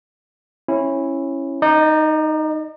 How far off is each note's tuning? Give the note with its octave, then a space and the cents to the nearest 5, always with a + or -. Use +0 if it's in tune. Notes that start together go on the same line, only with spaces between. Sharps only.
C#4 -20 E4 +0
D#4 +0 D5 +45